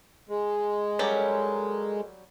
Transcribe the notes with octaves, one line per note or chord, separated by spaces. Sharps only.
G#3
F#3 G3 C#4 A4 A#4